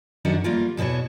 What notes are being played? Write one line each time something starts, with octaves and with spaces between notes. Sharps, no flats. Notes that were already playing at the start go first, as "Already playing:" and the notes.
F#2 D#3 D4 F#4 F#5
G3 A3 A#3 F4
E2 B2 E3 F#4 C#5